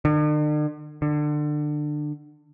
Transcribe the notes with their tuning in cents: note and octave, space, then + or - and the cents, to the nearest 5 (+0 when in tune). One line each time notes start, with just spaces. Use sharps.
D3 +45
D3 +25